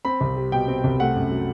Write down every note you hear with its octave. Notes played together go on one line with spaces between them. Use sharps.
C4 B5
C2
G3
B2 G5
C4
C2
A3 F#5
F#2
F#3